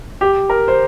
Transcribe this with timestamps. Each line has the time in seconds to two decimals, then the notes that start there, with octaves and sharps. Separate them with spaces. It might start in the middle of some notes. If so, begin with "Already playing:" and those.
0.21 G4
0.50 A#4
0.68 C5